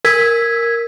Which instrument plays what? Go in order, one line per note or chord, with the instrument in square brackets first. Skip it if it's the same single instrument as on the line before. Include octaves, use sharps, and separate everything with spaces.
[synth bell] A#4 E6 G#6 B6